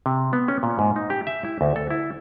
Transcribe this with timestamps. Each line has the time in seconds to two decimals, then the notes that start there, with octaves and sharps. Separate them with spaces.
0.06 C3
0.33 B3
0.48 C#4
0.63 A#2
0.79 G#2
0.96 D#4
1.10 G4
1.27 E5
1.45 E4
1.61 D2
1.76 A4
1.90 E4